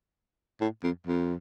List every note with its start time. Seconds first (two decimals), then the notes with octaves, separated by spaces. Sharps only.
0.61 A2
0.84 F2
1.07 F2